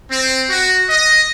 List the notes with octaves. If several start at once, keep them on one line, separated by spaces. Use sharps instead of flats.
C4
F#4
D#5